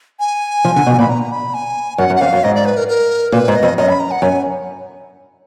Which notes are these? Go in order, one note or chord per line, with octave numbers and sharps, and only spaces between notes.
G#5
F3
D3
B2
A#2 B5
A#5
B5
G#5
F#2 F#5
F#2
F#5
F2 F5
F#2
G#2 D#5
D5
B4
A#4
A#4
A#2 B4
G#2
D#5
F2
F#2 D#5
B5
A#5
F#5
F#2 G#5